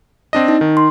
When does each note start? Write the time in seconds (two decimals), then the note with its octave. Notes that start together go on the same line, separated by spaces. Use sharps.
0.33 C4 D4 D#5
0.48 D#4
0.61 D#3
0.77 C6